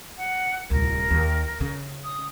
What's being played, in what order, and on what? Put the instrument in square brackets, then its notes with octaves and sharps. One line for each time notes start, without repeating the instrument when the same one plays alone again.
[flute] F#5
[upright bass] D1 C2 [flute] A#4
[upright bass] D#2
C#3
[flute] D#6